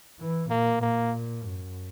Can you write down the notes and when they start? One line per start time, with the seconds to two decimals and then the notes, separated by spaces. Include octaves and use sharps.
0.20 E3
0.50 A#2 A#3
0.82 A#2 A#3
1.43 F#2